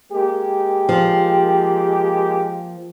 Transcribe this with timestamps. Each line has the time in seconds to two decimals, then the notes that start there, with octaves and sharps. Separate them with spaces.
0.11 G#3 A#3 G4
0.89 F3